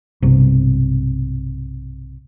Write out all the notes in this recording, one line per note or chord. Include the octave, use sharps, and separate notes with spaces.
B1 G2 C3